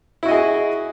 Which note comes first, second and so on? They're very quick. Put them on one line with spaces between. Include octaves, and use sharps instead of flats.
E4 F#4 D#5 G#4